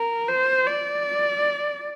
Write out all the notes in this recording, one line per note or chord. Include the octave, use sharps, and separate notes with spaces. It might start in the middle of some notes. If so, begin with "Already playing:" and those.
Already playing: A#4
C5
D5